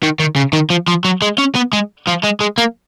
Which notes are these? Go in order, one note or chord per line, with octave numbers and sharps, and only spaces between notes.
D#3
D#3
C#3
D#3
F3
F3
F#3
G#3
C#4
B3
G#3
F3
G#3
G#3
A#3